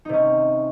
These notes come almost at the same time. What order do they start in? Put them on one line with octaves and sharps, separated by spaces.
D#4 C3 C#4